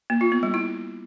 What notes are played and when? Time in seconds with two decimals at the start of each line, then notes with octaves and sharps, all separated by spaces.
0.10 A#3
0.21 F4
0.32 B3
0.43 G3
0.54 E4